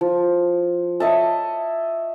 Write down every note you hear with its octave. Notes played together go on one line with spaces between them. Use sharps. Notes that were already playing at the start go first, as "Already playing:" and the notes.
F3
C#5 D#5 E5 A5